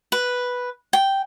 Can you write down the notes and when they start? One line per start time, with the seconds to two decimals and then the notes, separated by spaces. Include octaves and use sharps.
0.12 B4
0.93 G5